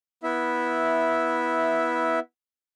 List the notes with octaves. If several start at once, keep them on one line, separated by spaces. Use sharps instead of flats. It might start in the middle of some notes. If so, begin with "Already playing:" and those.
B3 E4 E5